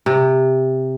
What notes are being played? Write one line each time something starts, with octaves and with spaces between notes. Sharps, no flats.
C3